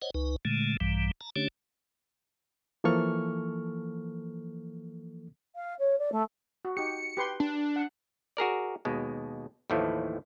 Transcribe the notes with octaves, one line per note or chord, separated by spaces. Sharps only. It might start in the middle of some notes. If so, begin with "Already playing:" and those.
C5 C#5 D#5 F#5
C#2 D#4 B4
A#2 D3 G#3 A3
A#1 G2 E3 G3
A5 A#5
D3 A3 C#4 D4 G4 C#5
E3 F3 A#3 A4 C#6 F6
F5
C#5
D5
A3
F#4
D#4 G4 C#7
G4 B4 C6
D4
F#5
F#4 G#4 A#4 D5
D#2 B2 G#3
D#2 A2 E3 F3 A3